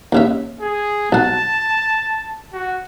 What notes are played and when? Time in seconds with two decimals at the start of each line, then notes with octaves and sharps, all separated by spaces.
0.12 D#2 C#3 E5
0.61 G#4
1.12 B1 F#5 A5
2.53 F#4